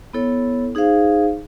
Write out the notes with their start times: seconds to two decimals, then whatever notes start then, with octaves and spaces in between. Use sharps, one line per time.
0.13 B3 E4 A4 C#5
0.75 D#4 G#4 C5 F5